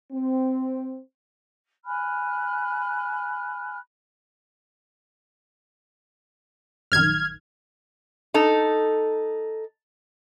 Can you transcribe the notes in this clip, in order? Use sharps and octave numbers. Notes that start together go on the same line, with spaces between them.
C4
G#5 B5 F6 F#6
A#1 F#2 D#3 F6 G#6
D#4 A4